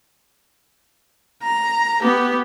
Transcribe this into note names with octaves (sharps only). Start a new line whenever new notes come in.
A#5
B3 G4